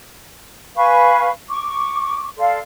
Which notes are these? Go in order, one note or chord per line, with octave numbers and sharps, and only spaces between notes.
B4 F5 G#5 C#6
C#6 D6
A4 D5 F5 C6